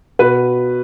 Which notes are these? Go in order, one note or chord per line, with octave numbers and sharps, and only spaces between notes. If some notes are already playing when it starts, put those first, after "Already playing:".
B2 B4